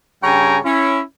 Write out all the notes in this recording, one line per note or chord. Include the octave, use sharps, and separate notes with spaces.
G2 C#3 C#5 G5 G#5 A#5
C#4 E4